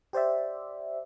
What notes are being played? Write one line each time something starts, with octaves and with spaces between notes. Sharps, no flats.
G4 C5 D5 E5